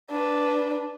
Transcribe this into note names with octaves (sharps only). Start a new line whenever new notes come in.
D4 B4